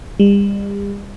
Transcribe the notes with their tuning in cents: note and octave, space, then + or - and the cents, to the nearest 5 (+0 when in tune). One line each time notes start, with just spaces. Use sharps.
G3 +40